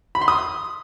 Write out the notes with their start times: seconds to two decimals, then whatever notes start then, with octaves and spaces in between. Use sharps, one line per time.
0.15 B5
0.21 C6
0.28 D#6